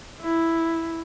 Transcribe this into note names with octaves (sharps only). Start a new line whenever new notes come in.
E4